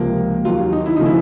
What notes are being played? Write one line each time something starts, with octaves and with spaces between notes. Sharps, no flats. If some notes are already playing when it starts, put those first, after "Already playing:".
Already playing: C#2 C3 F3 A#3
D#2 D#3 F#3 F4
D#4
E4
C#3 F3 A3 D#4
E4